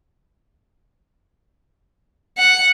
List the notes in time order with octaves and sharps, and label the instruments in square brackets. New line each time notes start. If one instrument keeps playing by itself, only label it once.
[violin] F#5